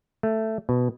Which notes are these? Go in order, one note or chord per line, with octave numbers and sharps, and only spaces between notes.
A3
B2